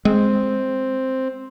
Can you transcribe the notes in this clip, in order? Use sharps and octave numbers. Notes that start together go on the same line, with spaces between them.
G#3 C4